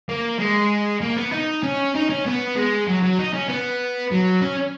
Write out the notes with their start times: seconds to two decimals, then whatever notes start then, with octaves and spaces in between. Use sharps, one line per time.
0.09 A#3
0.39 G#3
1.01 A#3
1.17 B3
1.32 D#4
1.63 C#4
1.95 D#4
2.09 C#4
2.26 B3
2.56 G#3
2.88 F#3
3.03 F#3
3.19 D#4
3.33 C#4
3.49 B3
4.12 F#3
4.42 C#4